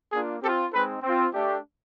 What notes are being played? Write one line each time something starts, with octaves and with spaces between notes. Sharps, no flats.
A#3 D4 F4 G#4
C4 F4 G4 A4
G#3 C4 D#4 A4 B4
C4 F4
A3 D4 G4